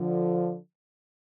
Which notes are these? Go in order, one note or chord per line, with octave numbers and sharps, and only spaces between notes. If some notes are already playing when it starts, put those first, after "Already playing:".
Already playing: D3 F3